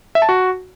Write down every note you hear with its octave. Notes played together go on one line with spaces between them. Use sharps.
E5
A5
F#4